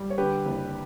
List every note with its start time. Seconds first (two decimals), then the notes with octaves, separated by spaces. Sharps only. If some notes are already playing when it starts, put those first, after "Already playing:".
Already playing: G3
0.10 C#5
0.18 D3 G4 B4
0.45 F#1